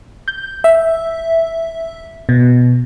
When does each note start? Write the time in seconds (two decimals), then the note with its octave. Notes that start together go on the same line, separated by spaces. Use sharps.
0.28 G6
0.64 E5
2.29 B2